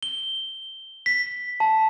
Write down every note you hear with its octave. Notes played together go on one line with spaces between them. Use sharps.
G7
B6
A5